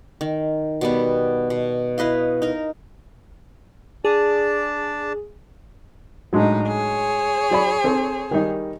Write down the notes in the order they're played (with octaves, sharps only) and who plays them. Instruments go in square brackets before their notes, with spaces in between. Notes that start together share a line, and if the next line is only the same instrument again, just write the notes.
[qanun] D#3
B2 G3 B3
B2
E4 B4 D#5 F5
D#4 A#4
[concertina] D4 D5 A5 [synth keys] G#4
[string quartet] A2 D#4 [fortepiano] F#3 G#3 D4
[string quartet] G#4 C#5
[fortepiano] F#3 D5 B5
C4 A4 C5
D#3 G3 D#4